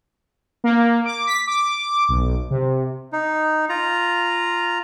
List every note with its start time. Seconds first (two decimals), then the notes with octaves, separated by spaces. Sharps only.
0.64 A#3
1.05 D6
1.27 B6
1.47 D6
2.09 B1
2.50 C3
3.13 D#4
3.69 F4 A#5